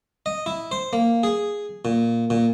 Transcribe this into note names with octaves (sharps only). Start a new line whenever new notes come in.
D#5
E4
C5
A#3
G#4
A#2
A#2